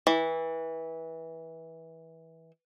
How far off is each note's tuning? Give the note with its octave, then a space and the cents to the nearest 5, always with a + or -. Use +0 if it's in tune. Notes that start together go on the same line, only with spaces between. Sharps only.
E3 -20